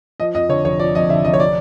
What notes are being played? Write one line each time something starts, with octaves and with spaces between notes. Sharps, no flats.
F3 D#5
F2 D#5
D3 C#5
F1 C#5
F3 D5
F2 D#5
D3 E5
F1 D#5
C#5
D5